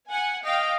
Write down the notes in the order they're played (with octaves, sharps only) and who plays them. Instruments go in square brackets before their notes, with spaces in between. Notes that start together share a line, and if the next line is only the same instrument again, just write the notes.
[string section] F#5 G#5
[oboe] D#5 [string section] F5 G5